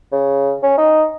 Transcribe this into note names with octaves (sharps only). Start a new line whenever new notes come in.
C#3
C#4
D#4